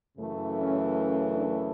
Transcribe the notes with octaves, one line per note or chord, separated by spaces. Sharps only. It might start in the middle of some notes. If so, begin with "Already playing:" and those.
F#2 C#3 E3 A3
C#4
C#4
D4